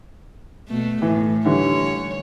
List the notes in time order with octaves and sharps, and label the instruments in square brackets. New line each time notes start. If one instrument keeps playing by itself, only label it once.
[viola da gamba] B2 A3
[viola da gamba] A2 [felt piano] E3
[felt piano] D3 E3 G3 [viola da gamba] C#5